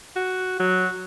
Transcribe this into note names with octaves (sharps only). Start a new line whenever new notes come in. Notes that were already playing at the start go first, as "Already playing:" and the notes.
F#4
F#3